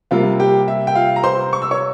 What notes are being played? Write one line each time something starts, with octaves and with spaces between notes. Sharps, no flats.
C3 G3 A#3 F4 F5
G4 G5
E5
G5
F4 F5
A#5
C5 C6
C#6
E6
C#5 C#6